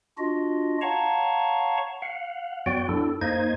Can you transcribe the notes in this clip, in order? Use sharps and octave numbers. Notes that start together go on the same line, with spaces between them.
D4 F4 F#4 D#5
C#5 F5 F#5 A5 A#5 C#6
F5 F#5
F#2 F#3 B3 F#4 D5 G5
D4 E4 A4
F#2 A#3 D#4 C5 D#5 G#6